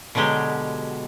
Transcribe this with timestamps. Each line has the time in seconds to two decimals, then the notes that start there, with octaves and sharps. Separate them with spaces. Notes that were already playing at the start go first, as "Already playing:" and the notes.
0.15 B2 D3 F#3 G#3 G4